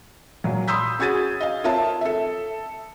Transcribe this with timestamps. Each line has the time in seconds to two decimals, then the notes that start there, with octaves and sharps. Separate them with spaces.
0.44 A#2 F#3
0.68 B5 C6 D#6 E6 G6 B6
0.99 C#4 F#4 G#4 G#6 A6 D#7
1.41 D#5 F5
1.64 C4 F4 A#4 C#5 E5 A5
2.01 A4 E5